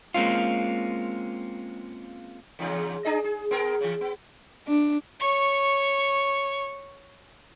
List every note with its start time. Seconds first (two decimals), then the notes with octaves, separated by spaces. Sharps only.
0.14 G#3 A#3 C4 C#4 F4
2.59 E2 G#2 C#3
3.05 D4 G#4 D#5
3.24 G#4
3.51 B3 G#4 A#4
3.81 C#3 E3
4.01 B3
4.68 D4
5.20 C#5 C#6